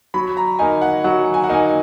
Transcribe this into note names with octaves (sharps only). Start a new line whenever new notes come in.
F#3 B5
A#5
A#3 D#4 G#5
F#5
F#3 F#5
G#5
F#5
A#3 D#4 G#5